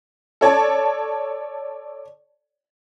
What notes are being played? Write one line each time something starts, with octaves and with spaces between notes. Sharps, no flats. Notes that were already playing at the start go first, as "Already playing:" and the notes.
A4 C#5 D5 A5